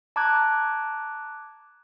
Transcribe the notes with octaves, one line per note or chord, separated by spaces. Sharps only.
A5 A#5 D6 F#6 G#6